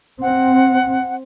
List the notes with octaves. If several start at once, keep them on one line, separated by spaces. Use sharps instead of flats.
C4 F#5